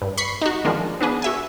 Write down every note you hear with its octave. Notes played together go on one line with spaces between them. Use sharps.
G2
B5 C#6 C7
D#4 F#4
D#3 F3 G#3 A#3 D4
B3 D4 G#4 B4
F#4 E5 G#5